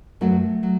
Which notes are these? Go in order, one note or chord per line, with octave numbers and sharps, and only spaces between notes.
F#2 F#3 A3 B3 F#4
F#3